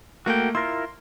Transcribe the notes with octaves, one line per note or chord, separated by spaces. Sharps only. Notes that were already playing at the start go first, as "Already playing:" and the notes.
A3 A#3 F#4 G5
E4 F4 A#4 C6